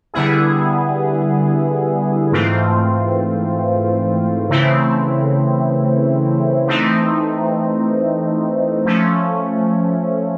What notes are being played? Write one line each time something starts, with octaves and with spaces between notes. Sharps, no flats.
D3 G3 B3 E4 G#4
G#2 E3 A3 C4 F4
C#3 E3 A3 C4 E4
E3 A3 C4 D#4
F3 A3 C#4